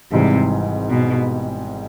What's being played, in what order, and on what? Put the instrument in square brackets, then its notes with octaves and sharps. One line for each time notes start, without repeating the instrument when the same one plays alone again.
[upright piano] G#1 G#2 E3 G3 [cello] C3
[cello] B2